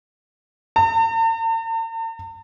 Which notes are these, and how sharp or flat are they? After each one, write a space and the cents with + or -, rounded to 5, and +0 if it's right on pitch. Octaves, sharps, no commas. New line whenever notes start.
A5 +45